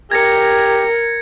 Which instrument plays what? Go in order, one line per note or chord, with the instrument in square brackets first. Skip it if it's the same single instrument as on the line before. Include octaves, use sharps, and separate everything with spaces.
[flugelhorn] G4 [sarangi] A#4 [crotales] G#6 A#6 C#7